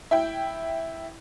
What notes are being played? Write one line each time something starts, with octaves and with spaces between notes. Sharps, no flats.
E4 G5